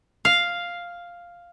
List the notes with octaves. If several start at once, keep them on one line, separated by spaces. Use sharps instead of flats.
F5